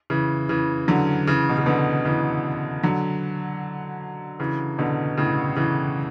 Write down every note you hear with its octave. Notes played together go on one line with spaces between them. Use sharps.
C#3 E3
C#3 E3
D3 F#3
C#3 E3
B2
C#3
B2 D3
C#3 E3
D3 F#3
C#3 E3
B2 D3
A2 C#3
C#3 E3